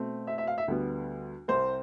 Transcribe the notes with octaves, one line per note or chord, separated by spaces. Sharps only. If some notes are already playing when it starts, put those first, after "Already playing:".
Already playing: B2 A3 C4
E5
E5
F5
E5
D2 D3 G3 B3
C2 C3 G3 C4 C5